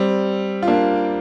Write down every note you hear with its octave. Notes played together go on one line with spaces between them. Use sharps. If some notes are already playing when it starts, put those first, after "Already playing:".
Already playing: G3 C4
F4
A#3 D4